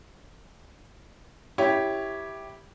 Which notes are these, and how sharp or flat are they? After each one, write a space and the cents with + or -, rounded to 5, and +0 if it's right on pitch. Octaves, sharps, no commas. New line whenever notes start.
E4 -10 G4 +0 C#5 +0